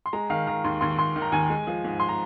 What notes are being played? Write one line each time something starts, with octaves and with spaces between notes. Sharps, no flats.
C6
G#3 A#5
D#3 F5
D#3 A#5
D#2 C6
D#2 C6
D#2 C6
D#3
A#5
D#2 G#5
G#3
F3
G#2
C6
A#5